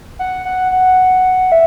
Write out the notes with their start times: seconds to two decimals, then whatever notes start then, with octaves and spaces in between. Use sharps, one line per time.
0.19 F#5
0.45 F#5
0.72 F#5
1.52 E5